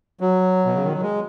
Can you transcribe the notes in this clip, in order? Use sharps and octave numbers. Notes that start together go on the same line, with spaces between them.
F#3
B2
C#3
D#3
F#3
G#3